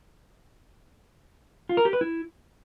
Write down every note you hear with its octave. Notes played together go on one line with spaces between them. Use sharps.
F4
A#4
G4
B4
E4